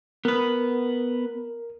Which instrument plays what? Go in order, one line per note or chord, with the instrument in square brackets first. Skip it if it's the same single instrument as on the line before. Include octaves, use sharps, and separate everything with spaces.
[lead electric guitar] B3 B4 [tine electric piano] A#4